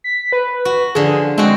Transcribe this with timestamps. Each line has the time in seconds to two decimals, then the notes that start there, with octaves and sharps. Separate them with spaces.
0.04 B6
0.32 B4
0.65 F#4
0.95 D3 F3 G#4
1.38 G#3 C4 F#4